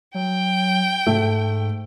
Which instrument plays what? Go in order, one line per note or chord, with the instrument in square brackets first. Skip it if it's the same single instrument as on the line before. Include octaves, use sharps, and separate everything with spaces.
[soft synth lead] F#3 [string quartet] G5
[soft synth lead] G#2 [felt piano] A3